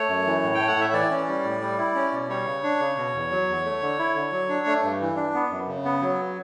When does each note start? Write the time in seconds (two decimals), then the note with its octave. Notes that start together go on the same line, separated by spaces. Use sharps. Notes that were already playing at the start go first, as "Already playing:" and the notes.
Already playing: A3 C#5
0.09 F#2
0.26 E3
0.43 A2
0.55 G5
0.60 A3
0.68 F#5
0.77 A2 E5
0.93 E3 D5
1.11 C#4
1.28 G3
1.45 A2
1.61 G3
1.78 E4
1.95 C#4
2.12 B2
2.29 G3 C#5
2.46 C#3
2.63 D4
2.80 C#3
2.97 B2
3.14 E2
3.31 F#3
3.48 E2
3.64 A3
3.81 D3
3.99 E4
4.15 D3
4.32 F#3
4.49 D4
4.66 A3
4.83 G2
5.01 E3
5.17 D4
5.34 B3
5.51 F#2
5.68 C#3
5.85 B3
6.01 F#3